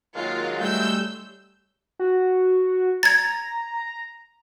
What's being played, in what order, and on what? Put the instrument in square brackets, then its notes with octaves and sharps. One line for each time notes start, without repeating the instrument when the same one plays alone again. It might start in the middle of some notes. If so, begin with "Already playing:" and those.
[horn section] D#3 F#3 G#3 [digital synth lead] A#3 [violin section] F4
[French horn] G3 [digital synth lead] A3 [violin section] E6 G6
[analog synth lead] F#4
[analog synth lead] A#5 [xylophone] G#6 A6